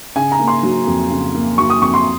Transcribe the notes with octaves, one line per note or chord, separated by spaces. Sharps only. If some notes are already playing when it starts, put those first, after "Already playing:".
C#3 G#5
A#5
A#3
C6
F#3
F2
C#3
A#3
F#3 C#6
D#6
F2 C#6
C6